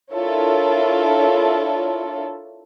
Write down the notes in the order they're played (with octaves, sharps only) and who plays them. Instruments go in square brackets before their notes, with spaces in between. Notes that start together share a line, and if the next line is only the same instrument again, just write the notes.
[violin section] D4 E4 F4 A4 A#4 C#5